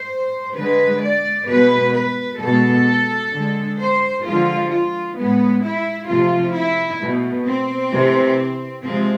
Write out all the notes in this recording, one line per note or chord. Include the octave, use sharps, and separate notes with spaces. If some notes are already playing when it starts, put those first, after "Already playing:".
Already playing: C5
D3 G#3 B4
D5
B2 G#3 B4
B4
B2 G#3 A4
D3 G#3
C5
D3 F3 G#3 F4
F4
A2 G#3 B3
E4
C3 F3 A3 F4
E4
B2 A3
C4
C3 E3 A3
C3 F3 G#3 C4